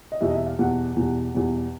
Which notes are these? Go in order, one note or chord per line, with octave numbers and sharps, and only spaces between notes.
D#5
E2 B2 G3 E5
D#5
E5
F5
E2 B2 G3 F#5
E2 B2 G3
E2 B2 G3